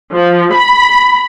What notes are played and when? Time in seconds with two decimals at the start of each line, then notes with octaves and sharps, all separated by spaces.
0.13 F3
0.54 B5